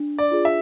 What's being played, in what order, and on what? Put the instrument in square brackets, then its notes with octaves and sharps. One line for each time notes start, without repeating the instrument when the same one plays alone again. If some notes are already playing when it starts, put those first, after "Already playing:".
Already playing: [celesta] D4
[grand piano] D5
[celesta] F4 G#4
[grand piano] E5